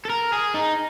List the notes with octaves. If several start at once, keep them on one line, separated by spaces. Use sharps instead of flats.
A4
A#4
G#4
D#4